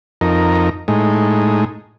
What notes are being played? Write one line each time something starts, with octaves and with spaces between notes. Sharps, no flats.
F2 D#4 A#4
A2 G#3 D#4